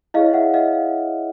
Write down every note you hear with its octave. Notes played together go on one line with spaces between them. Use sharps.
E4 G#4 C#5 D#5 F5
E5 F#5
D#5 F5